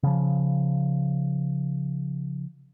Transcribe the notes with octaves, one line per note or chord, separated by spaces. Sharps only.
C#3 F3